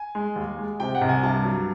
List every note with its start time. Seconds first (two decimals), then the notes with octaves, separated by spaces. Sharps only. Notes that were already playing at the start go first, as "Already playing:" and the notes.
Already playing: G#5
0.15 G#3
0.36 D#2
0.58 G#3
0.80 C3 G5
0.95 F#5
1.01 C2
1.09 G#5
1.23 G2 A5
1.45 F#3